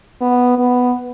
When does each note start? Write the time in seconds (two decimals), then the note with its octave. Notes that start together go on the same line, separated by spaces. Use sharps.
0.21 B3
0.58 B3